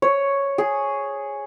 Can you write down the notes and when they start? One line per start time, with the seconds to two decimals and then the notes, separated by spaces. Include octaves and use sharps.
0.02 C#5
0.58 G#4